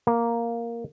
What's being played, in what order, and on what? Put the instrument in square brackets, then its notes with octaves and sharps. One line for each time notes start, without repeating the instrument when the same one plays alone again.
[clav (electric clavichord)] A#3